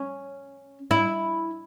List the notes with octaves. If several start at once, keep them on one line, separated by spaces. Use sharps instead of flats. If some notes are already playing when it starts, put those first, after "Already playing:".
Already playing: C#4
E4